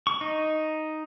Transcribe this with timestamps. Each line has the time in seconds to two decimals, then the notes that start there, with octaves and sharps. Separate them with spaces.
0.07 C#6
0.21 D#4